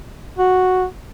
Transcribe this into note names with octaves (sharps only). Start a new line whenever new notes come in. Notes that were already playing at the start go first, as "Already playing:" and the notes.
F#4